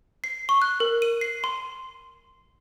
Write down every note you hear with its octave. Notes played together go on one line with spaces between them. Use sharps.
C7
C#6
F#6
A#4
D#7
C7
C6